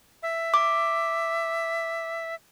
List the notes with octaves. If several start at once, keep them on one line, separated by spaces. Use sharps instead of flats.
E5
D6